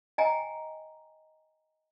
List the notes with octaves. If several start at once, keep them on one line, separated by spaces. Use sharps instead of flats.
D#5 G5 G#5 A#5